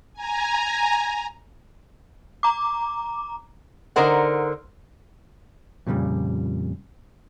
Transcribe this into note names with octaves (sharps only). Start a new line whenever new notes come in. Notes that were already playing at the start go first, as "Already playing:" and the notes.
G#5 A#5
A#5 D6
D3 D#4 A#4 C5 F#5
F2 A#2 C#3 G3